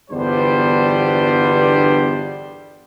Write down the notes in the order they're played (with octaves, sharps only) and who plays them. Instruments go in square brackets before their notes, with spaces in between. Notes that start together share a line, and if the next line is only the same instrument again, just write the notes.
[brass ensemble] G1 E2 G3 B3 D4 C5